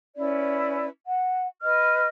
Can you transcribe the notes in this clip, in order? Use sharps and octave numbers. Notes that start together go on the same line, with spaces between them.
C#4 E4 B4 D5
F#5
B4 D#5 F6